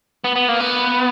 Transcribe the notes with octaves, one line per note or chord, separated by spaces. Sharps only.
B3
B3
A#3
B3